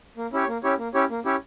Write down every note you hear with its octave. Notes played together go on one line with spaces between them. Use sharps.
A#3
C#4 E4 G4 C#5
A#3
C#4 E4 G4 C#5
A#3
C#4 E4 G4 C#5
A#3
C#4 E4 G4 C#5